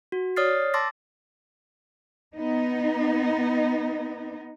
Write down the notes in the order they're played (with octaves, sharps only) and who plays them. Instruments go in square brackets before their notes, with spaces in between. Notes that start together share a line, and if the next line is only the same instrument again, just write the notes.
[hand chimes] F#4
C#5 D5 D#6 F6 A6 C7
A5 C6 D6 E6 A6 A#6
[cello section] B3 D#4